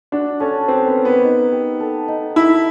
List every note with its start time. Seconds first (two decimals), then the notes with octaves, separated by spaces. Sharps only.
0.12 D4 F#4
0.40 C#4 A4
0.68 C4 F#4
0.87 B3
0.97 A#4
1.05 B3
1.24 D#4
1.52 G4
1.80 A4
2.08 D#4
2.36 E4 A4